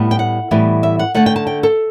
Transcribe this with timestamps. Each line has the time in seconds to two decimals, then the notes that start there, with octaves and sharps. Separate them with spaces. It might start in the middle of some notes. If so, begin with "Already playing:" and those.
Already playing: A2 G3 B3
0.11 G5
0.19 F#5
0.51 A2 E3 G3 B3
0.83 E5
0.99 F#5
1.15 D3 A3 F#5
1.26 G5
1.36 A5
1.47 G5
1.63 A4